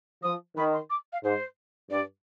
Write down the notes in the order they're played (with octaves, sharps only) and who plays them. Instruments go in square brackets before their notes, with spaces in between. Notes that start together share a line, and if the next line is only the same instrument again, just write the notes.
[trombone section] F3 [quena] D#6
[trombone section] D#3 [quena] B5
[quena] C6
D6
F5
[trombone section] G#2 [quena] C5
[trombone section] G2 [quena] D5